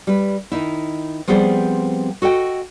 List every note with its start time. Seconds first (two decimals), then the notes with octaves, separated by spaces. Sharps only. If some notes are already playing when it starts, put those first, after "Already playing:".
0.07 G3 B4
0.52 D#3 D#4 E4
1.28 F3 G3 B3 C4 G#4 C5
2.22 F#4 A4 D#5 G5